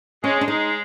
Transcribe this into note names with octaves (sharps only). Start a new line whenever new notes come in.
G#3 C#4
D4
G#3 D#4